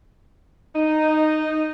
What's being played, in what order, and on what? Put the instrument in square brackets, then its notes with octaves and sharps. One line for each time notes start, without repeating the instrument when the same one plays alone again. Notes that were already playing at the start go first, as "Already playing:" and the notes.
[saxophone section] D#4